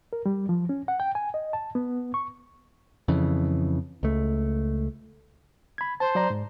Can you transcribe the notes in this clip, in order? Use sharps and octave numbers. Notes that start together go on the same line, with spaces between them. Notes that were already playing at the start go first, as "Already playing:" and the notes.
A#4
G3
F3
C#4
F#5
G5
G#5
D#5
A5
B3
C#6
F2 C#3 E3
C#2 A3
B5 G#6
C5 A5
F#3 D5 A#5
G#2